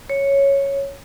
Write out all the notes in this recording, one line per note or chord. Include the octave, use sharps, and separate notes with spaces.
C#5